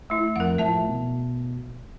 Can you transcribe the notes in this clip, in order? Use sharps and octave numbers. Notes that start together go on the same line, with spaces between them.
A3 E4
F2 A#4 F#5
A2 F3 E5 A5
B2